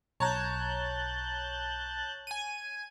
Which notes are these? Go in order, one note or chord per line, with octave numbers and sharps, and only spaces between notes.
B1 C#5 A5 A#5 F#6 G6
G#5 D#7